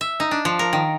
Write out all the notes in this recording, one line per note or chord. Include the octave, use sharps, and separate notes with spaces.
E5
D#4
D4
F3
A#4
D#3